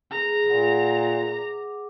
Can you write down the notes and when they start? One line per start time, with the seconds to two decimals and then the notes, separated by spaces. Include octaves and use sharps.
0.11 G#4 B4 A#5
0.46 A#2 B4 E5 F#5
1.31 D6